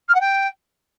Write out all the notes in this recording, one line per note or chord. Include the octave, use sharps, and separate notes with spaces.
F6
F#5
G5